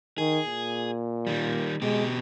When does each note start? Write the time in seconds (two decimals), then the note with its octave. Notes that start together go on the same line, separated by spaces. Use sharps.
0.18 D#3 G#4
0.46 A#2
1.27 D#3 G3
1.82 B2 G#3 G4